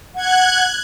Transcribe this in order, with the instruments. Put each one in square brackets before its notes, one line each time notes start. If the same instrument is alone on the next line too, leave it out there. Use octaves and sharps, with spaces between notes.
[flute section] F#5 [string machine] F#6 G#6